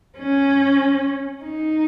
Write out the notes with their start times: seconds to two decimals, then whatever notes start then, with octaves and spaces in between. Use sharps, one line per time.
0.18 C#4
1.44 D#4